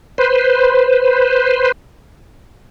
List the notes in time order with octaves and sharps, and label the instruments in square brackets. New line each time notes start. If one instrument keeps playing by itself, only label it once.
[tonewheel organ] B4 C5